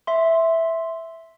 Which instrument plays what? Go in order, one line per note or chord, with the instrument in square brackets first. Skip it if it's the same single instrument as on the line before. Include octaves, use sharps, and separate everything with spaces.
[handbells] E5 C6